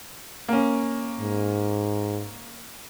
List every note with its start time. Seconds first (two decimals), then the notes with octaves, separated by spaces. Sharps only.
0.48 A#3 C#4
1.20 G#2